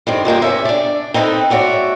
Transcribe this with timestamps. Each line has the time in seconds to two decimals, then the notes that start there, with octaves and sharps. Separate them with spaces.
0.07 G2 D#3 C4
0.25 A#2 G#3 A#3 G4
0.42 C3 C#4 E5
0.65 D4 D5
1.14 C4 D#4 E4 F#4 A4 B4
1.50 G#2 F#4 C#5 D5 E5